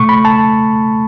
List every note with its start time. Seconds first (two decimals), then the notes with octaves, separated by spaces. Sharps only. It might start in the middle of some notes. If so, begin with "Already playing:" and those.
Already playing: B2 A3 C#6
0.09 B5
0.25 A5